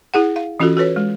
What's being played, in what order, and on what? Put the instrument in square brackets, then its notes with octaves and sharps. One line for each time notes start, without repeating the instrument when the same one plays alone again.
[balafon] E4 G#4 F#5
F5
E3 C#4 F4 F#4 A4
F#4 A4 B4 C#5
G#3